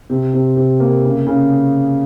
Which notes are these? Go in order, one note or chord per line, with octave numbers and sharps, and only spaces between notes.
C3
C3
C3
A#3
C#3
C#3